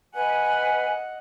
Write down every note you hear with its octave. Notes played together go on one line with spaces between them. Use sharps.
B4 D#5 F#5 G#5